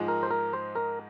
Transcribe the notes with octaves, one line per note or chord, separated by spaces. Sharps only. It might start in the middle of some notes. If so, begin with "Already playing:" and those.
Already playing: G#2 F3 G#3 D#4
A#4
C5
A#4
C5
A#4